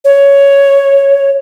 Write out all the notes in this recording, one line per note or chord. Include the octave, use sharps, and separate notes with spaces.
C#5